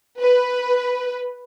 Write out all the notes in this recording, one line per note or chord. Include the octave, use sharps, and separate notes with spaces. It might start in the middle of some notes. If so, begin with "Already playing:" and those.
B4